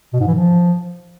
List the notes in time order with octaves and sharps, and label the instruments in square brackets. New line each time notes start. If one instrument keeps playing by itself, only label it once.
[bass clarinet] B2
G#2
E3
F3